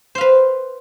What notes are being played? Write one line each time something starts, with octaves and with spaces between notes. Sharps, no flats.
B4 C5 F5